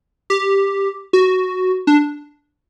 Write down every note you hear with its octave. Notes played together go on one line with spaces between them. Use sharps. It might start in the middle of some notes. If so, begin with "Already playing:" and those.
G4
F#4
D4